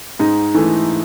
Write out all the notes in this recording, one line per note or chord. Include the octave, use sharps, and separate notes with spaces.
G#2 D#4
E3 A3